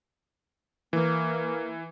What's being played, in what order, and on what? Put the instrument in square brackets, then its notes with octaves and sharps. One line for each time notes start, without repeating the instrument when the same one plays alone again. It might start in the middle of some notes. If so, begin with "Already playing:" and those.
[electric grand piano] E3 [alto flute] A#3